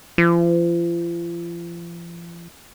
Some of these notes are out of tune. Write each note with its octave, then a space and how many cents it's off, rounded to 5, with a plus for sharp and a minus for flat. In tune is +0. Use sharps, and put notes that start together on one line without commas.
F3 -40